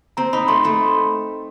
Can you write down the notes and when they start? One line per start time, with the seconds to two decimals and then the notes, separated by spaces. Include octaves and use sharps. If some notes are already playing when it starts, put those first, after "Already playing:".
0.17 C4 A#5
0.33 D#4 B5
0.48 A3 C6
0.64 A3 B5